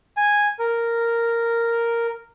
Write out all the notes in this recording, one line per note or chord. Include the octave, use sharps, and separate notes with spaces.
G#5
A#4